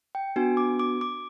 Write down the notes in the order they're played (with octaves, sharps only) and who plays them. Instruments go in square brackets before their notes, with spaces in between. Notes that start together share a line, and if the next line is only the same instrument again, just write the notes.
[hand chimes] G5
B3 D4 F#4 G#5
D6
D6
D6